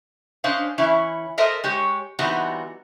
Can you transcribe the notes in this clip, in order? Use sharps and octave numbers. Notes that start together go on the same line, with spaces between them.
C#4 D4 C5 D#5 F5
E3 C#4 E4
A4 A#4 C5 D#5 E5
G#3 G4 C#5
E3 G3 B3 C4 D#4 F#4